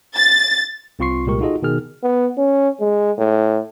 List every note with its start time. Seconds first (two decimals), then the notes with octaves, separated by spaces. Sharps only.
0.14 A6
0.99 C2 C4 F4 C6 C#6 C7
1.26 C2 A#2 G#3 G4 A#4 C#6
1.40 D#4 F4 F#4 G#4 A4 D#5
1.62 B2 D#3 G#4 F6
2.03 B3
2.38 C#4
2.81 G#3
3.18 A2